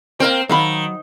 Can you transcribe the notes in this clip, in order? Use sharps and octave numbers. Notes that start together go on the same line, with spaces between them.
A#3 C4 A#4 G5
D#3 F#3 F5 B5